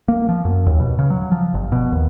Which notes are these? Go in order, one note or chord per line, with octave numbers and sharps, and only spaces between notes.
A#3
F3
F#2
D#2
B2
C#3
F#3
F3
G1
B2
D#2